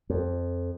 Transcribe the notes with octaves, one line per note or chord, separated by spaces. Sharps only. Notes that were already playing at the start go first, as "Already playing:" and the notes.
F2